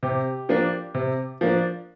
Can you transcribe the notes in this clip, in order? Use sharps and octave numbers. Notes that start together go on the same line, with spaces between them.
C3 G4
F3 A#3 D4
C3
F3 A#3 D4